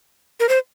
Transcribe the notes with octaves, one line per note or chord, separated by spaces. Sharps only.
A#4
C5